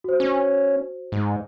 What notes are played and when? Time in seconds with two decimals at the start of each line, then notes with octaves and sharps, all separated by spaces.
0.04 F#4 C5
0.20 C#4
1.12 G#2